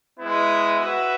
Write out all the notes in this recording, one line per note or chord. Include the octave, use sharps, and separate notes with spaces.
G#3 B3 E4
F#4 B4 E5